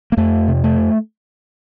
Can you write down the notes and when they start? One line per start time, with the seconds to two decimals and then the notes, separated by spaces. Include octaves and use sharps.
0.12 A#3
0.17 F2 A3
0.48 C3
0.64 A3